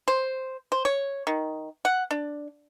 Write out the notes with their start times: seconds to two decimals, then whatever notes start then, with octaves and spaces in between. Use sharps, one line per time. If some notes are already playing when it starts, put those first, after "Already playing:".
0.08 C5
0.72 C5
0.85 C#5
1.27 D#3
1.85 F#5
2.11 D4